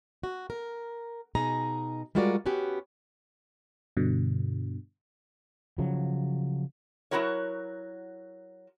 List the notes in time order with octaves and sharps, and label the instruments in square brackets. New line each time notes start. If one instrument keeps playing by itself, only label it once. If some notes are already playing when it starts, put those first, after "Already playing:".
[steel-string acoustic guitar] F#4
A#4
B2 D#4 G#4 A#5
G3 G#3 F4 F#4 A#4 D5
B3 C#4 F#4 G4
[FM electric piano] G2 B2 D3
[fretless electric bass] C#3 F3 F#3
[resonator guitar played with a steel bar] F#3 B3 E4 F#4 A#4 C#5